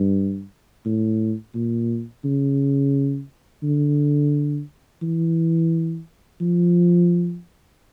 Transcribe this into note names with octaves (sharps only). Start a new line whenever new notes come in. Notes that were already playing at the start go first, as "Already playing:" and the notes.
Already playing: G2
A2
A#2
C#3
D3
E3
F3